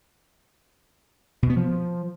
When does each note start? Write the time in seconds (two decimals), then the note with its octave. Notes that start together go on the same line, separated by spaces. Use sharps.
1.43 B2
1.50 B3
1.57 F3